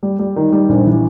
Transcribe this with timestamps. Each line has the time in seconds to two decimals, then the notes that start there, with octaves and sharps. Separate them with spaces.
0.03 G3
0.19 G3
0.36 D#3
0.52 G3
0.69 A#1
0.86 E3